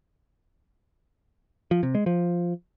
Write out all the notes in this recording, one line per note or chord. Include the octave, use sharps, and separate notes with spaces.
F3
C3
G#3
F3